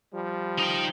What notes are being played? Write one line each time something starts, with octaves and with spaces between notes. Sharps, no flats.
F3 G3
D#4 G5